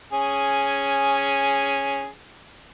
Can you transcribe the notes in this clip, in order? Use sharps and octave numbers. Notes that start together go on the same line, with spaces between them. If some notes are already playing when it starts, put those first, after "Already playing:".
C#4 G#4